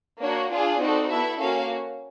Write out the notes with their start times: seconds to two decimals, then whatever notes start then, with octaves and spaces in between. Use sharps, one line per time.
0.20 A#3 D4 F#4 C#5
0.51 D4 F4 G#4 D5
0.81 C4 D#4 F#4 A4
1.10 B3 E4 A4 E5
1.41 A#3 C#4 F#4 F5